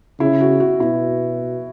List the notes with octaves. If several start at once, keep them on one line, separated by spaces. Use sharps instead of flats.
C#3 E4
F#4
F#4
B2 E4